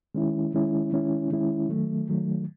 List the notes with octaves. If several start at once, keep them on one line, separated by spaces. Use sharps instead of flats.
D#3 G#3 C#4 E4
D#3 G#3 C#4 E4
D#3 G#3 C#4 E4
D#3 G#3 C#4 E4
D#3 F#3 A3
D#3 F#3 A3